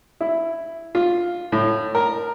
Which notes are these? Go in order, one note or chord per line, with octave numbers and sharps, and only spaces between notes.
E4
F4
A2
A#4